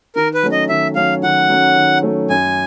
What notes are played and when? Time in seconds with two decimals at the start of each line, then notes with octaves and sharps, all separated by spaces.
0.16 D#3 A#4
0.34 B4
0.43 F#3 A3 C#4
0.52 D#5
0.69 D#3 E5
0.95 F#3 A3 C#4 F5
1.23 D#3 F#5
1.49 F#3 A3 C#4
1.76 D#3
2.03 F#3 A3 C#4
2.29 F#2 G#5